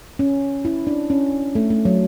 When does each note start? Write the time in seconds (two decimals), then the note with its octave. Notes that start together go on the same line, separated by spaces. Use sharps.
0.19 C#4
0.65 E4
0.87 D4
1.10 C#4
1.55 A3
1.70 A3
1.85 F#3